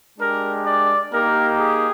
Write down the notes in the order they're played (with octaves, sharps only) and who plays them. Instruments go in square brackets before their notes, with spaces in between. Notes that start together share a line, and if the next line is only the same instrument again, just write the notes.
[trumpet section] G#3 D4 G4 A#4
D5
A#3 D#4 G4 A#4
G#4